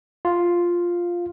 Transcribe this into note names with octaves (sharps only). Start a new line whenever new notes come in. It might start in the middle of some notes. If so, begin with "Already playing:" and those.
F4 F5